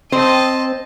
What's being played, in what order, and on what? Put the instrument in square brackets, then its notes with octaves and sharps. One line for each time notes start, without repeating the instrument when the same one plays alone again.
[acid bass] C4 [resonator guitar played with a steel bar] C5 [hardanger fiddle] D#5 A5